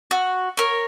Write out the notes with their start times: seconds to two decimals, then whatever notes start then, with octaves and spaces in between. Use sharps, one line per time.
0.11 F#4
0.57 A#4 C#5